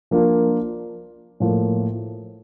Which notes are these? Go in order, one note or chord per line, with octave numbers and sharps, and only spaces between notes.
F3 A#3 D4 F4
A2 F3 A#3